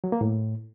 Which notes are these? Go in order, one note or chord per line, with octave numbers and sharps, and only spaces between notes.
F#3
A#3
A2